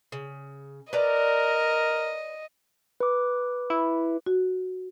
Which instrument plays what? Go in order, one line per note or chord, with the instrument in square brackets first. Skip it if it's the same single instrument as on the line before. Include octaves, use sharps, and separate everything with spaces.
[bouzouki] C#3
[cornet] A#4 [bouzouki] B4 D5 A#5 [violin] D#5
[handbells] B4 D6
[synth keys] E4
[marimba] F#4